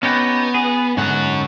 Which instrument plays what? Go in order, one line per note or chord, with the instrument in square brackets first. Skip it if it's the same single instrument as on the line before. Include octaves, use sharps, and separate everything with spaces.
[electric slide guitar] B3 [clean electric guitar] C#4 D#4 G4
[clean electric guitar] G#4
[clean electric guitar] G#2 D3 G#3 [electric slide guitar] C#4 F#5